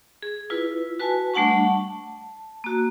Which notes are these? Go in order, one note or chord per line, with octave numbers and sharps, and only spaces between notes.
G#4
E4 F4 B4
F#4 B4 G#5 A5
G3 A3 D4 F#5 A5 C#6
A5
A#3 F#4